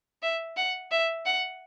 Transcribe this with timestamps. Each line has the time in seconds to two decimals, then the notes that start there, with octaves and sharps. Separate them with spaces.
0.23 E5
0.57 F#5
0.92 E5
1.26 F#5